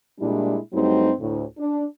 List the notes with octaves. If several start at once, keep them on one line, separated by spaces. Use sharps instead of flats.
A#2 G3 G#3 D4 E4
G2 F#3 G3 A3 C4 D#4
D2 A2
D4